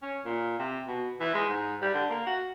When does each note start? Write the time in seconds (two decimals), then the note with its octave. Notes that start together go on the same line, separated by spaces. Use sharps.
0.02 C#4
0.25 A#2
0.59 C3
0.87 B2
1.20 E3
1.34 G#3
1.49 G#2
1.81 G3
1.94 D3
2.10 A#3
2.26 F#4